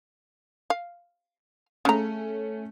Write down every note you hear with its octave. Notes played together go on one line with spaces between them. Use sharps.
F5
C#3 A3 C#4 A#5